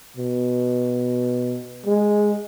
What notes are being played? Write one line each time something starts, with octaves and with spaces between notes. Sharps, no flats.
B2
G#3